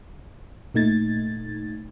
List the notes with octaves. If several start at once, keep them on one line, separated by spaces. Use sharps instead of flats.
A#2 A3 D#4 G#6 A6